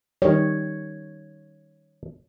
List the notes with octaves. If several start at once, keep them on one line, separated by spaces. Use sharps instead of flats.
D#3 G3 C#5